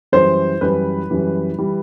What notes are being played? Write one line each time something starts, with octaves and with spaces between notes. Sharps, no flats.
F#2 E3 G3 C5
F#2 E3 G3 B4
F#2 E3 G3
E3 G3